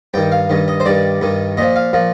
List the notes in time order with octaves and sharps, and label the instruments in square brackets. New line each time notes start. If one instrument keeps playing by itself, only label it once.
[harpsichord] G2 D#3 G5
F5
G2 D#3
D#5
C5
G2 D#3 D5
G2 D#3
A#2 F3 D#5
F5
A#2 F3